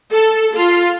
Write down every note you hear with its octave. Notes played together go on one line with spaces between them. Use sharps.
A4
F4